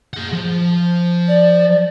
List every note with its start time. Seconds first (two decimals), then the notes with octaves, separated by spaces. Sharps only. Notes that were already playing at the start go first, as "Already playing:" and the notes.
0.14 G#4 F#5
0.32 F3
1.27 D5